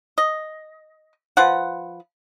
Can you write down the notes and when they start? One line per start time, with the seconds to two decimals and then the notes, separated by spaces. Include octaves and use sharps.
0.18 D#5
1.37 F3 B4 F#5